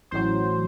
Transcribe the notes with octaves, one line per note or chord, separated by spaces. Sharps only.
A1 A2 F#3 C5